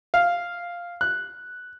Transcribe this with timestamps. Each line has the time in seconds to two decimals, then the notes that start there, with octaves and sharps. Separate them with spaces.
0.14 F5
1.01 F#6